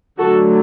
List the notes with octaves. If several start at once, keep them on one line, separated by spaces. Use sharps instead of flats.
D3 F#3 A3 F#4 A4